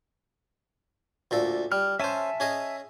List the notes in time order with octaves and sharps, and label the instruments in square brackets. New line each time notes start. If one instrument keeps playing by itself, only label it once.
[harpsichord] D2 A#2 A4
[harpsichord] G3 [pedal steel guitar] F6
[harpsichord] C#4 C5 [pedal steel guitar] E5 G#5 A5
[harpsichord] C#4 G#4 D#5